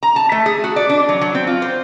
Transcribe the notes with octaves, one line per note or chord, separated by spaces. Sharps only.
A#5
A5
A3
G#4
F#4
D5
D4
F#3
F#3
C4
F4
C5